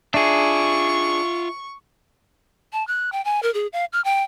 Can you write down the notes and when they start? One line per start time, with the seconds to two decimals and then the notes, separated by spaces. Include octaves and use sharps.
0.14 D4 F4 G#4 E5 C#6
2.73 A5
2.87 F#6
3.12 G5
3.25 G#5
3.43 A#4
3.54 G#4
3.73 F5
3.93 F6
4.05 G5